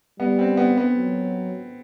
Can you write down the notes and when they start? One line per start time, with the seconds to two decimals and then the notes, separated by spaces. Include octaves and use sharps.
0.19 G3 B3
0.39 C4
0.57 B3
0.77 B3
0.96 F#3